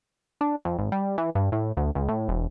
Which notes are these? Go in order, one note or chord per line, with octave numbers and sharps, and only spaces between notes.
D4
F2
G#1
G3
E3
G2
A2
D2
C#2
A2
E1